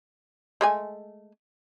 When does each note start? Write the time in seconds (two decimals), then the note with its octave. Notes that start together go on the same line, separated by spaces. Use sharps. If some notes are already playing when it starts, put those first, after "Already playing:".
0.61 G#3 A3 G#5